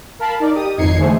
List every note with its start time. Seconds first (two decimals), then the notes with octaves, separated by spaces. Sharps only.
0.19 A#4 F5 A5 B5
0.40 D#4 A#4 D5
0.55 G4 D#6
0.77 G#1 F2 D#4 G#6 C7 C#7
0.97 D3 E3 G#3 A3 G#4 C5